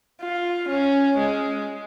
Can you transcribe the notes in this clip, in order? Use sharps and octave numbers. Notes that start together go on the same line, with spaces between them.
F4
C#4
G#3